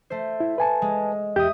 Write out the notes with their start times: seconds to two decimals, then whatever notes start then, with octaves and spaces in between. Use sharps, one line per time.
0.10 A3 C5
0.40 E4
0.58 B4 G#5 A5
0.82 G#3
1.36 E2 G4 E5 D#6 G6